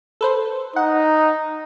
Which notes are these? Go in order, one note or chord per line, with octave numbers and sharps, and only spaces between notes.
A4 B4 C5
D#4 F#5